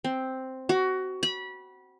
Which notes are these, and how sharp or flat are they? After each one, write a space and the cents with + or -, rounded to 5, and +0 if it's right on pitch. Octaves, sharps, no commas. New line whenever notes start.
C4 +0
F#4 +20
B5 -25